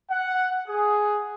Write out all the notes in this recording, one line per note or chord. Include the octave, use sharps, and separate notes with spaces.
F#5
G#4